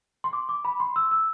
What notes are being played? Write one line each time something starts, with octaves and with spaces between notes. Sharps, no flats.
C6
D6
D6
B5
C6
E6
E6